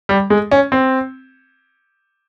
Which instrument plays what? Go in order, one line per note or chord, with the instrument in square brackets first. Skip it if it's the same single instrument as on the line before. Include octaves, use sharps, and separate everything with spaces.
[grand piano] G3
G#3
C#4
C4